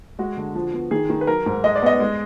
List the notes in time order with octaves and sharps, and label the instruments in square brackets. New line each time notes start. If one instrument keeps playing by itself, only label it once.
[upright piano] G#3 F#4
D3
F3
B3
D#3 G#4
D#3
B4
F#3 A#4
G#2
G#3 D#5
D5
B3 D#5
G#3